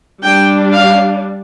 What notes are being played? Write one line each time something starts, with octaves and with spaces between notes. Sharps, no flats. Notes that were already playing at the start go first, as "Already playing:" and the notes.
G3 D4 G5
F5